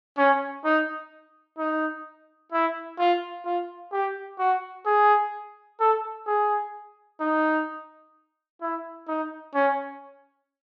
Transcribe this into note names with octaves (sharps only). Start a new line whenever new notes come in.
C#4
D#4
D#4
E4
F4
F4
G4
F#4
G#4
A4
G#4
D#4
E4
D#4
C#4